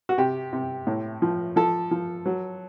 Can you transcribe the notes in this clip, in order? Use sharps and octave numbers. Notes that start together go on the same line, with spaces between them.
F#4
C3 G4
C3
A2
F3
F3 A4
F3
F#3